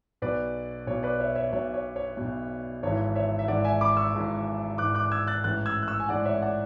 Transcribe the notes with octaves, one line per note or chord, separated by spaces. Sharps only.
B1 B2 B4 D5
B1 B2 C#5
B4 D5
C#5 E5
C#5 E5
B1 B2 C#5
C#5
C#5
B1 B2
G#1 G#2 E3 C#5
C#5 E5
E5
G#1 G#2 E3 D5 F#5
E5 G#5
B5 D6
C#6 E6
G#1 G#2 E3
G#1 G#2 E3 D6 F#6
D6 F#6
F#6
E6 G#6
F#6 A6
A1 G#2 E3 F#6 A6
E6 G#6
F#6
C#6 E6
G#5
A1 G#2 E3 D5 F#5
C#5 E5
D5 F#5